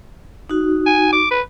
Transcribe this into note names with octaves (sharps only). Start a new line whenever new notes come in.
D#4 F#4
G#5
D6
B4